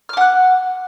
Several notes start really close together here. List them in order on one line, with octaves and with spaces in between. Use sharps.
F6 D6 F#5 F#6